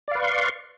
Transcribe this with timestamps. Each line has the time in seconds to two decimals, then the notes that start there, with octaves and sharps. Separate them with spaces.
0.08 D5
0.11 F5
0.15 B4
0.19 C#6
0.23 C6